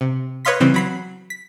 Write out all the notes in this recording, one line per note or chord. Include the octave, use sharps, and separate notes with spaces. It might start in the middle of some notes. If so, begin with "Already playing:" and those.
C3
B4 C#5 D#5 F5 C6 B6
C#3 E3 G3 C4
F#3 B5 C7
B6